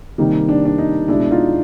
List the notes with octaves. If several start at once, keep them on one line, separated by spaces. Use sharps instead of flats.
C3 D#3 G3 A#3 D#4
D4
D4
D#4
B2 G#3 D4 E4
D#4 F4